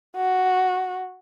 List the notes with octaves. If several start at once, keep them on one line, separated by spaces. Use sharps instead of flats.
F#4